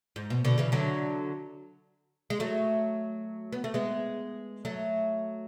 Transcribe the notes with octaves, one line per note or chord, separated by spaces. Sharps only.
G#2
B2
B2 D3
C#3 E3
D3 F#3
G#3
F#3 A3
B3
A3
G#3 B3
F#3 A3